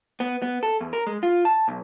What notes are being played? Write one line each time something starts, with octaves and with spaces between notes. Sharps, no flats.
B3
B3
A4
E2
A#4
G#3
F4
A5
B1